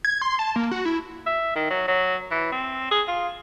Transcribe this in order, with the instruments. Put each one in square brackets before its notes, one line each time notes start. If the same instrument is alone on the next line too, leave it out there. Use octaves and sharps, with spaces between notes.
[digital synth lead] G#6
C6
A5
A#3
F#4
E4
[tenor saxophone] E5
D#3
F#3
F#3
E3
C4
G#4
F4